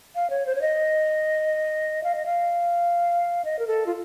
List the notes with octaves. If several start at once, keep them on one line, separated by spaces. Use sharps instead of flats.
F5
C#5
C5
C#5
D#5
F5
D#5
F5
D#5
A#4
A4
F4